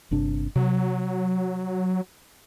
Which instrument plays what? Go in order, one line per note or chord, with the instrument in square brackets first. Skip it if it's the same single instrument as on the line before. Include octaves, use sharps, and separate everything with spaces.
[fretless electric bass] G1 C3 D4
[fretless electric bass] C3 [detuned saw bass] F#3